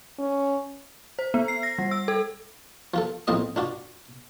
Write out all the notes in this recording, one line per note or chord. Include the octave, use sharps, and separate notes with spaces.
C#4
C5
B3
C7
A#6
G3
E6
A4
F3 F4 A4
A#1 A2 C4 F4 D#5 D#6
D4 F4 F#4 D5